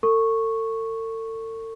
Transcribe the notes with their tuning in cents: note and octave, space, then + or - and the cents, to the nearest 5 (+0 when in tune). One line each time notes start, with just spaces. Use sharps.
A4 +40 C#6 -5